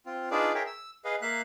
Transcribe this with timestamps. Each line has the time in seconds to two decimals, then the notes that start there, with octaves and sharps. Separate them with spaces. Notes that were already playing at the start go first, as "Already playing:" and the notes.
0.06 C4 F4
0.31 D4 D#4 F4 G#4 B4 D5
0.55 G#4 A#4 C#5 E5 G5
0.67 E6
1.05 G#4 B4 D#5 F5
1.22 A#3 E5 F5 F#6